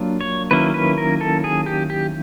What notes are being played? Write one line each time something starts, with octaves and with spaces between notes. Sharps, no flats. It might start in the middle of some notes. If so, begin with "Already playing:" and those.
Already playing: F#3 A#3 D4 F4
C#5
D#3 F#3 A#3 C#4 E4 B4
B4
A#4
A4
G#4
G4
G4